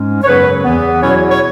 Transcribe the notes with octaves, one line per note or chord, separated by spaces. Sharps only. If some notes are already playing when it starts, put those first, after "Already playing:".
Already playing: G#2 G#3 C#4
C#5
F#2 C#3 F#3 B3 B4
E2 E3 B3
E2 B2 F#3 C#4 E4 C#5
C#5